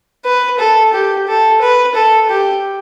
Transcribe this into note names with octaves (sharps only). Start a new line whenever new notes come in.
B4
A4
G4
A4
B4
A4
G4